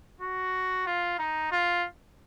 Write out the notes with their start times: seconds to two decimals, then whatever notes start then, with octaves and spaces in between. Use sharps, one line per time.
0.21 F#4
0.86 F4
1.19 D#4
1.52 F4